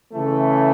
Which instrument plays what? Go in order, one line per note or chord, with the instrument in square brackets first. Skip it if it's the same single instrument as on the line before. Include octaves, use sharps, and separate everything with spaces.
[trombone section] C#3 E3 A3